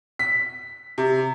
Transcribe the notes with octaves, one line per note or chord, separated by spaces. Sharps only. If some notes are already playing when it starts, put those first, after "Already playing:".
B6
C3